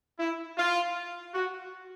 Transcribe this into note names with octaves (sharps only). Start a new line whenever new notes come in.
E4
F4
F#4